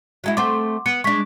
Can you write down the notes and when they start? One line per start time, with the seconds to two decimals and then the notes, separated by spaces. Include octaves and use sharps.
0.24 F#3 G#3 E4
0.37 A3 C4 C5 F#5 C6 D6
0.86 B3 C#7
1.04 G#3 D4 C#6 B6